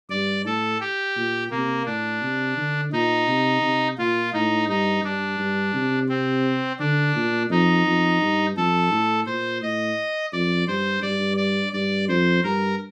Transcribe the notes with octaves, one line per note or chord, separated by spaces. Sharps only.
G2 D5
A2 A4
G4
A#2
C3 A#3
A2 D4
C3
D3
A#2 D#4
C3
C3
A#2 F4
A2 D#4
G2 D#4
G2 D4
G2
C3
C4
D3 D4
A#2
F2 D#4
F2
G2
F2 A4
A2
A#2 C5
A2 D#5
F2 D5
G2 C5
G2 D5
D5
G2 D5
F2 C5
G2 A#4